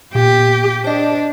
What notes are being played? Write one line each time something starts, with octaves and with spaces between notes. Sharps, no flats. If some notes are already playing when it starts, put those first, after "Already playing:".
A#2 B3 G4
D4 C5 D#5